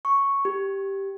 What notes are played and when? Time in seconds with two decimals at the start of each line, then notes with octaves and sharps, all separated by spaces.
0.05 C#6
0.45 G4